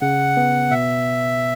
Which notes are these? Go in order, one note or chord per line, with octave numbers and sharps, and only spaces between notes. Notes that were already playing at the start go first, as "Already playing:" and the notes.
C#3 F#5
B3
B2 E5